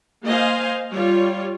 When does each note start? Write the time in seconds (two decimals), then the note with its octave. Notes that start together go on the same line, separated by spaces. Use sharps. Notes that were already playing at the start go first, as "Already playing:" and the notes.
0.25 A#3 C5 D#5 F5 G#5
0.92 G3 F4 C#5